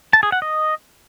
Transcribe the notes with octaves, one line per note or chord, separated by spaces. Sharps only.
A5
G#4
F#5
D#5